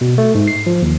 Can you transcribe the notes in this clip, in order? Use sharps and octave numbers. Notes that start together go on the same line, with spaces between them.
B2
A3
G#2
C7
F3
D#2